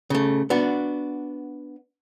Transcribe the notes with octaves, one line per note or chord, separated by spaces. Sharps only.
C#3 A3
B3 D4 F#4